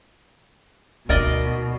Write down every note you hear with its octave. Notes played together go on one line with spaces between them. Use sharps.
D2 B2 D#4 A#4 D5 D#5